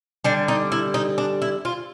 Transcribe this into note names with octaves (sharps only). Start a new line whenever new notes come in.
D3 G3 D4
D#4
E4
D#4
D4
E4
F4